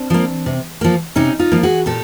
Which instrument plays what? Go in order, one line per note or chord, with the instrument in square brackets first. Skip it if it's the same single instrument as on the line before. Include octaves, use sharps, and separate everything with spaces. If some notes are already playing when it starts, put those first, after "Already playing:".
Already playing: [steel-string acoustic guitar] C4 D4
F3 A#3
C3
F3 A#3
C3 C#4 D#4
D#4 F4
F3 A#3
F#4 G#4
A#2 G4 A4